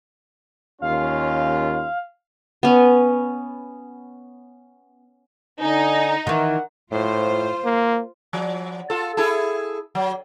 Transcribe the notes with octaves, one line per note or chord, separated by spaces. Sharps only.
D#2 C#4 F4 F5
B3 C#4
D3 D#4 G#5
D#3 E3 A#4 F#5
A2 F4 C5
A#3
F3
F4 A4
E4 G#4 A4
F#3